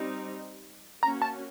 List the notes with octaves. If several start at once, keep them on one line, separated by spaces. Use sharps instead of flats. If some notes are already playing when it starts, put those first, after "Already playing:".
Already playing: G3 C4 D#4
A#3 C#4 F#4 A#5
A5